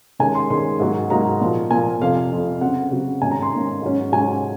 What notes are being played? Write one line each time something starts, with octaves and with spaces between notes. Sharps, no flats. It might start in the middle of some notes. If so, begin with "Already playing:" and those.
D#3 G#3 C#4 G#5
C6
D#3 G#3 C#4 C6
G#2 F#3 A#3
G#2 F#3 A#3 A#5
A#2 F3 A#3
A#2 F3 A#3 G#5
F2 C3 F3 F5
F2 C3 F3
C#3 F#3 C4 F#5
C#3 F#3 C4
G#2 D#3 A#3 C#4 G#5
A#5
C6
G#2 D#3 A#3 C#4
G#2 F#3 C#4
G#2 F#3 C#4 G#5